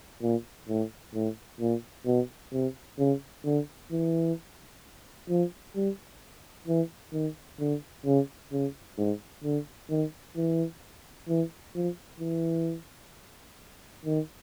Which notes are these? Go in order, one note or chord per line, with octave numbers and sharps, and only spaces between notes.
A#2
A2
A2
A#2
B2
C3
C#3
D3
E3
F3
G3
E3
D#3
D3
C#3
C#3
G#2
D3
D#3
E3
E3
F3
E3
D#3